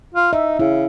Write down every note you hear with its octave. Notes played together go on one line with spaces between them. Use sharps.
F4
D#4 E5
C#3 E4